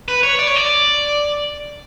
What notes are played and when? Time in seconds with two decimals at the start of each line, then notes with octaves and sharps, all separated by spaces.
0.08 B4
0.23 C#5
0.39 D5
0.48 C#5
0.56 D5